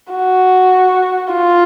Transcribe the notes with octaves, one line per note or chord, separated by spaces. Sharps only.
F#4
F4